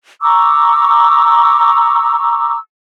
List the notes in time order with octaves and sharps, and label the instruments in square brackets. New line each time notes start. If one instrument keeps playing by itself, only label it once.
[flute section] A#5 C#6 D6 E6